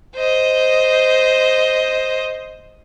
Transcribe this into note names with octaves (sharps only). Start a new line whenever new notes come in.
C5 D#5